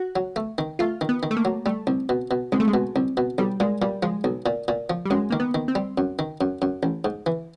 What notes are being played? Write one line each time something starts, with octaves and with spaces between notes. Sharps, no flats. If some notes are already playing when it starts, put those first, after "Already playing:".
Already playing: F#4
F#3
A3
D#3
A3 F4
D#3
B3
D#3
A3
A#3
F#3
G3 A3
C2
B2
B2
C2 G#3
A3
G#3
B2
C2
B2
B1 G3
A#2 G#3
A#2 G3
F3 G#3
B1
A#2
A#2
F3
G3
F#2 G#3
D#3 A#3
B3
D#3
C4
G3
F#2
D#3
F#2
F#2
A1
G#2
E3